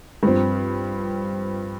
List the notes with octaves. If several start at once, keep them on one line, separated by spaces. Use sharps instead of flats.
G2 F3 C4